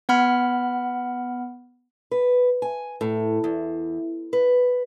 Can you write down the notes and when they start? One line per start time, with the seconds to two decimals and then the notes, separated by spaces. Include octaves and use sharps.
0.09 B3 F#5 B5 F6
2.11 B4
2.62 G#5
3.01 A2
3.44 E2
4.33 B4